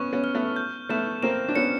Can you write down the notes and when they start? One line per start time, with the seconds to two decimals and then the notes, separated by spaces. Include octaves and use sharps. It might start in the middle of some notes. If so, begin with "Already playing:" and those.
Already playing: B3 C#4 C#6
0.13 B3 C#4
0.24 F6
0.35 A3 B3
0.56 G6
0.89 A3 B3 E7
1.23 A#3 C4 E7
1.48 D4
1.55 B3 C#4 C#7